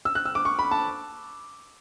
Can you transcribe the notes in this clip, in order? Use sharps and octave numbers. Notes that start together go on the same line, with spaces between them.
E6
F#6
E6
D6
C#6
B5
A5